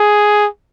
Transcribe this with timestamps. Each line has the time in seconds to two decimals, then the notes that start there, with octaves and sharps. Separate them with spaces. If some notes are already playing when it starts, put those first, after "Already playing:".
Already playing: G#4